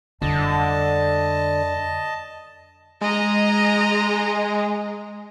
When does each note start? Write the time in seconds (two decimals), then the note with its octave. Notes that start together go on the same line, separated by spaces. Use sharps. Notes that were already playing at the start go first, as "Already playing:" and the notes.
0.22 F2 D3 G3 D#5 A5
3.01 G#3 D#5 A#5